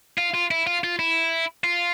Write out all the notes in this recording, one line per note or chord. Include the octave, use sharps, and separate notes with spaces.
F4
F4
E4
F4
F4
E4
F4